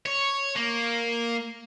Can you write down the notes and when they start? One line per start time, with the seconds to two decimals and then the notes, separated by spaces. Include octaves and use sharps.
0.06 C#5
0.56 A#3